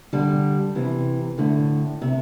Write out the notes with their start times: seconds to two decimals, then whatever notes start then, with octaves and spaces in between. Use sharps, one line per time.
0.13 D3 G3
0.75 C3 E3
1.38 A2 D3
2.02 C3